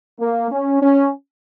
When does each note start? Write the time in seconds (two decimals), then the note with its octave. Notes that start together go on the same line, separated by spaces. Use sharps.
0.20 A#3
0.52 C#4
0.82 C#4